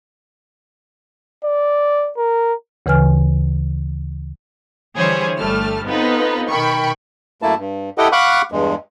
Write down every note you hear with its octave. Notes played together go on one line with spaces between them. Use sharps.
D5
A#4
D2 C#3 E3 B4 G#5 F6
D3 E3 G3 G#4 C5 C#5
G1 G3 A3 A5 F6
B3 C4 D#4 F4 A4 B4
B2 D#3 G5 B5 C#6
F#2 A3 A#3 E4 A5
G2
E4 G4 A4 D#5 F#5 G5
F5 F#5 B5 C#6 D6 F#6
E2 G2 G#3